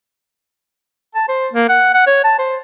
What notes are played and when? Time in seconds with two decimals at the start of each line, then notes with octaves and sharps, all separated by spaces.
1.15 A5
1.29 C5
1.53 A#3
1.69 F#5
1.94 F#5
2.07 C#5
2.24 A5
2.39 C5